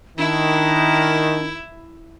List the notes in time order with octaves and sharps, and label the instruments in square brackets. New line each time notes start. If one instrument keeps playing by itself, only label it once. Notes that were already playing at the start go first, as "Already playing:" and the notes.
[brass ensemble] D#3 [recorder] D4 [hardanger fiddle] E4